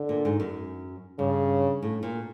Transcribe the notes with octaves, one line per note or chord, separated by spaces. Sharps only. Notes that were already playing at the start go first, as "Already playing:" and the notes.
Already playing: D3
A#2
G#2
F#2
G2 C#3
A2
A#2